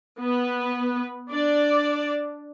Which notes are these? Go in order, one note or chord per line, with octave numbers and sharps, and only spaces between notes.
B3 B4
D4 D5